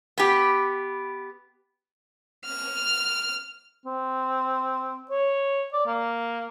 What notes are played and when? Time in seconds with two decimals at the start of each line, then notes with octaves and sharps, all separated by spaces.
0.18 B3 G4
2.45 F6
3.86 C4
5.10 C#5
5.73 D5
5.86 A#3